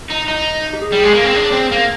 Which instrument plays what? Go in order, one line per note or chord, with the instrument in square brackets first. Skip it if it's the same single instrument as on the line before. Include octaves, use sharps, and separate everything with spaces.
[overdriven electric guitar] D#4
D#4
[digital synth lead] G4
G#4
[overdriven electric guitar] G3
G#3
A#3
C4
D4
C4
A#3